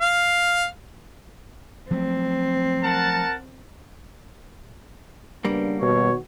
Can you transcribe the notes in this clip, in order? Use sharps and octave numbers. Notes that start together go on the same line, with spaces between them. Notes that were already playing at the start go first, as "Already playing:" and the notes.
F5
F3 F#3 A3 C4
A#4 F#5 A5
C#3 G3 A#3 B3 D4
B2 D#3 F#4 B4 C#5